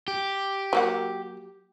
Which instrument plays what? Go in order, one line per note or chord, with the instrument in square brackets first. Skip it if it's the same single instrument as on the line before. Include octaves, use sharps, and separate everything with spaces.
[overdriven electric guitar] G4
[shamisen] F#3 A#3 F#5